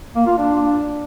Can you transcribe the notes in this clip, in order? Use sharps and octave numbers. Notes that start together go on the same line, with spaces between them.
A#3
F4
D4